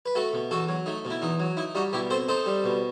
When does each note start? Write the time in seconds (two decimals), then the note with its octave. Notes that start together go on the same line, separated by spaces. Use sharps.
0.06 B4
0.15 A3 F#4 A4
0.33 B2
0.51 E2 F#4 A4
0.68 F#3
0.86 A3 D#4
1.05 B2
1.10 E4
1.22 E2 D#4
1.40 F#3
1.57 D#4 E4
1.75 G3 D#4 F#4
1.93 B2 E4 G4
2.10 C4 A4 C5
2.28 D#4 A4 C5
2.46 G3
2.64 B2